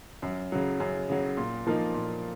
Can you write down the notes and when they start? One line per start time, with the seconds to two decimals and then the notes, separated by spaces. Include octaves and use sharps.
0.22 F#2
0.52 C#3 F#3
0.80 F#2
1.09 C#3 F#3
1.37 A#2
1.67 F3 A#3 D#4
1.94 A#2